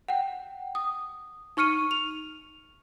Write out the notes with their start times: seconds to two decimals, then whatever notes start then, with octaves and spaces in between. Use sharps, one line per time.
0.08 F#5 G5
0.75 D#6
1.57 D#4 C#6 F6 C#7 D#7
1.91 F7